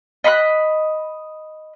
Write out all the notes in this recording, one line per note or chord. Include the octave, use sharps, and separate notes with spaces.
D#5 B5 C6 F#6